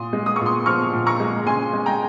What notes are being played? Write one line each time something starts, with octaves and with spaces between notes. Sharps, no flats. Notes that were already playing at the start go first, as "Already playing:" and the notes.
Already playing: A#2 C6 D#6
G#3
D#6
A#2 C#6
C6 D#6
F3 C#6 F6
A#2
A#5 C#6
G#3
C#3 G#5 C6
G#3
G5 A#5